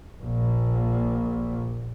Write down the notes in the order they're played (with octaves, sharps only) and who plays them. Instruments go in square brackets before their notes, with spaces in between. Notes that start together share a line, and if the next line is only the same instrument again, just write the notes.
[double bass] A#1 A#2